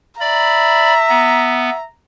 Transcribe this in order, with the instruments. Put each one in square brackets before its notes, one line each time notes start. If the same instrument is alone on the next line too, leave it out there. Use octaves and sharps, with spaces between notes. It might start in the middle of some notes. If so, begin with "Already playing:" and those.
[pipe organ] D5 B5 [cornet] E5 [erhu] A#5
[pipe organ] B3